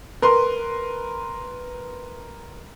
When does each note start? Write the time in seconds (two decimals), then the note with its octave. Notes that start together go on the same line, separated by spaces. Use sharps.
0.22 A#4 B4 C6